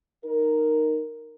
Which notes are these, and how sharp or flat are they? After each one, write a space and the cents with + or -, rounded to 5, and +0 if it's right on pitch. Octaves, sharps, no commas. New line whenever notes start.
D#4 -15 A#4 +0